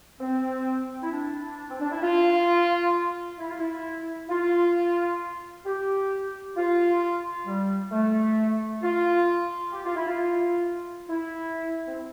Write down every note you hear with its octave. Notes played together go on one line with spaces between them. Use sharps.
C4
E4
D4
C4
D4
E4
F4
E4
F4
E4
F4
G4
F4
G3
A3
F4
G4
F4
E4
F4
E4
C4